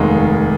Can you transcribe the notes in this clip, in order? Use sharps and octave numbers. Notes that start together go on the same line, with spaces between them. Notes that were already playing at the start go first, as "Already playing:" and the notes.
Already playing: F1 D#2 D#3 G#3